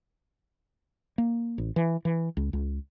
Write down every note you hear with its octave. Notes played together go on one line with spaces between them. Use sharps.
A#3
A1
E3
E3
C#2
C#2